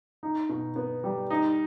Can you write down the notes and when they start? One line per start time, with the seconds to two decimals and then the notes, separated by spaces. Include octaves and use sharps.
0.23 D#4
0.49 B2
0.76 B3
1.04 G3
1.30 D#4